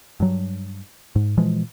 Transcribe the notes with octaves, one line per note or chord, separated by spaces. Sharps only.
G2 F#3
G#2
A#2 E3 F3 G#3